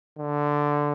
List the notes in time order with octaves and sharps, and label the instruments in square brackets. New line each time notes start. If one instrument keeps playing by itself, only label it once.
[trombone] D3